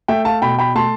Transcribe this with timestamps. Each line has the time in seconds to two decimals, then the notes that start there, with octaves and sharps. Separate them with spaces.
0.08 A3 E5 G5
0.25 F5 A5
0.42 B2 G5 B5
0.58 G5 B5
0.75 A3 A5 C6